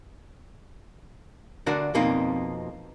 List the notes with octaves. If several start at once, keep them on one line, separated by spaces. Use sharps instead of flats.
D3 D4 F#4 A#4 D5
F2 B2 A#3 C4 D#4